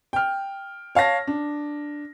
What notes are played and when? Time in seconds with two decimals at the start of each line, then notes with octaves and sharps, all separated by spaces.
0.13 G5 F6
0.95 C#5 F5 A5 A#6
1.27 D4